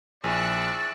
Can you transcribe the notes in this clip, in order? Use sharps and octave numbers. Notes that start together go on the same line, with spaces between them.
A#1 E4 G#4 D5 C#6 E6 F#6